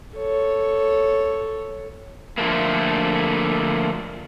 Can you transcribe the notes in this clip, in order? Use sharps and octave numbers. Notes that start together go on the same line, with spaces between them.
A4 C#5
D3 F3 G3 A3 A#3